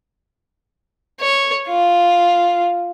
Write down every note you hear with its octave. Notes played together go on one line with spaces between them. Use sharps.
C#5
F4